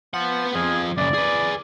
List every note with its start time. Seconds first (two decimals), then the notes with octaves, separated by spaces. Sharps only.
0.14 F3 B3 F#5
0.54 F2 F3 G#4
0.98 F#2 C#3 D5
1.14 G#4 B4